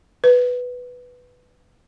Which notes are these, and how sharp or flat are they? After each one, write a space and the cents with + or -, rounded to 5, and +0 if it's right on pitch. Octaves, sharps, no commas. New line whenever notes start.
B4 +5